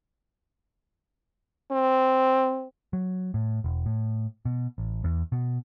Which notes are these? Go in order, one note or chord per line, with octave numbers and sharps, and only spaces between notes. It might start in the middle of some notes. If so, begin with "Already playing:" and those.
C4
F#3
A2
E1
A2
B2
A1
E2
B2